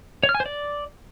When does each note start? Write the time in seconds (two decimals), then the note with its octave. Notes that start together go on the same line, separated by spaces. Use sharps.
0.23 C#5
0.29 F6
0.35 G#5
0.40 C5
0.46 D5